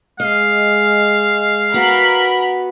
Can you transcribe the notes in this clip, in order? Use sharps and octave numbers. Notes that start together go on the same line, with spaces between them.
G#3 D#5 F5
B3 F#4 A#4 B5